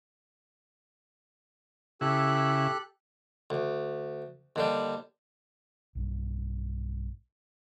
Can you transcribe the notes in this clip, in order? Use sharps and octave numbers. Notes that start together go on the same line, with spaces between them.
C#3 E4 G4 A4 F#6
D2
D#2 D3 G3
B1 G2